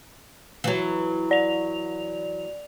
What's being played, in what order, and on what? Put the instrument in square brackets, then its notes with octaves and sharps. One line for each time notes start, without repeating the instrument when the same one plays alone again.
[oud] E3 F#3
[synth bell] D5 F7